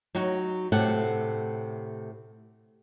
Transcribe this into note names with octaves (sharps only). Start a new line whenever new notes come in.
F#3 D#4 F#4
A2 C3 A4 F#5